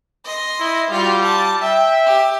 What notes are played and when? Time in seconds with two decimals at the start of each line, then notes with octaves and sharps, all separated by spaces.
0.25 D#5 C6
0.60 E4
0.90 G3 F4 F#4
1.21 A5
1.62 E5 G5
2.06 G4